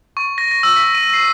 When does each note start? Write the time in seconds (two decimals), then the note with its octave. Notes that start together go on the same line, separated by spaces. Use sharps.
0.17 C#6
0.38 A#6
0.51 A#6
0.63 E6
0.76 B6
0.95 D#7
1.14 C7